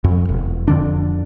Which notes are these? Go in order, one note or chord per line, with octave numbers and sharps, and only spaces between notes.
F2
E1
F2 D3 D4